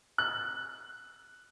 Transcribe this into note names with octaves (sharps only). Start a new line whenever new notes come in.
F#6